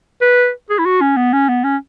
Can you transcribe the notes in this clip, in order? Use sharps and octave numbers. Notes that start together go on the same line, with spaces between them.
B4
G#4
E4
F#4
C#4
B3
C#4
B3
C#4